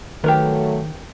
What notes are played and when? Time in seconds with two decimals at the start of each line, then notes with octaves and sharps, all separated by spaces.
0.24 D#3 F#3 A3 G4 A#4 B4